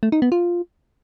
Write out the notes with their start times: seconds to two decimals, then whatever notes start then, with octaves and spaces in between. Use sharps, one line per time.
0.03 A3
0.12 D#4
0.22 B3
0.32 F4